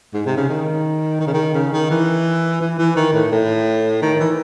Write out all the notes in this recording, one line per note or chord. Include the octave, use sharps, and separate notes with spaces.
G#2
C3
C#3
D#3
D#3
C#3
D#3
C#3
D#3
E3
E3
E3
D#3
A2
A2
D#3
E3